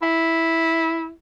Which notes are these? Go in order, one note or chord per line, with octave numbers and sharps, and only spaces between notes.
E4